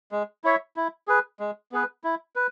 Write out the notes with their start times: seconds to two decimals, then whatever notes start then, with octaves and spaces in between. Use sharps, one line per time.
0.12 G#3
0.44 E4 C#5 E5
0.76 E4
1.08 G#4 B4
1.40 G#3
1.72 B3 G#4 B4
2.04 E4
2.36 B4